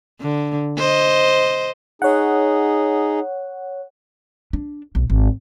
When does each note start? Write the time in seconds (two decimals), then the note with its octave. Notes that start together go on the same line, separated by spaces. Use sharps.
0.20 D3
0.78 C5 D#5
2.02 D#4 G#4 C#5 F#5
4.53 D4
4.95 B1
5.10 G#1